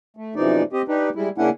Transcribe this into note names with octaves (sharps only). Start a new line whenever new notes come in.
A3
F#2 C3 E3 F3 D#4 D5
C4 G4 D#5
D4 D#4 G4 B4
G3 G#3 E4
C#3 A#3 C#4 D4 E4 F#5